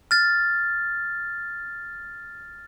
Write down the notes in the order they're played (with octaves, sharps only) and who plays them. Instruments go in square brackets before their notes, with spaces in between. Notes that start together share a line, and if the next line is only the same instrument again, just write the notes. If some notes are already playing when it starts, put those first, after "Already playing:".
[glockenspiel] F6 A6